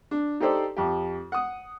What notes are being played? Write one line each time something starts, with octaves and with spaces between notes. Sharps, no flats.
D4
D#4 G4 A4 C5 D5
F2 G4
F#5 D#6